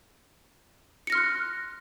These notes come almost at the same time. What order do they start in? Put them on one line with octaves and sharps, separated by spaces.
C#7 A#6 F6 C6 F#6